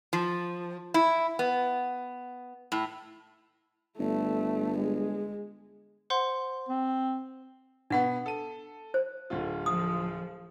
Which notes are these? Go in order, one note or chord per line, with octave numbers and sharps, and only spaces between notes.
F3
E4
B3
A2
G1 A3
G#3
C5 F#5 C6
C4
B2 B3 D4 F#5
A4 D#7
C5
D1 D3 F4
F3 D#6